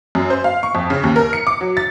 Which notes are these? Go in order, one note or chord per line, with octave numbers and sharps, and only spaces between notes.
F#2
C5
F5
C#6
F2
C#3
D#2
A#4
C#7
D6
F#3
A6